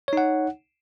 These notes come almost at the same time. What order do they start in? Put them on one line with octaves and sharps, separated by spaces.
C#5 D#4 F#5